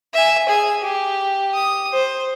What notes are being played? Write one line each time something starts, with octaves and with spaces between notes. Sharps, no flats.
E5 G#5
G#4 G#5
G4
D#6
C5